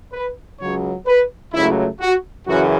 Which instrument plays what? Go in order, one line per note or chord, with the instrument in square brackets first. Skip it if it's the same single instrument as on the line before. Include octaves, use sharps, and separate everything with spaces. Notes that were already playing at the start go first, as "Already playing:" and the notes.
[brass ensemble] B4
C#2 C#3 F#3 C#5
B4
C#2 C#3 F#3 A3 E4
F#4
F#2 C#3 E3 F#4